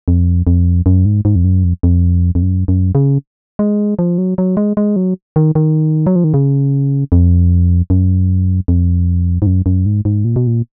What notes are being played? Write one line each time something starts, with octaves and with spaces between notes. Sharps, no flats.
F2
F2
F#2
G#2
G#2
F2
F#2
F2
F2
F2
F#2
F#2
C#3
G#3
F3
F#3
F#3
G#3
G#3
F#3
D#3
D#3
F#3
F3
D#3
C#3
F2
F#2
F2
G#2
F#2
F#2
G#2
G#2
A#2
B2
A#2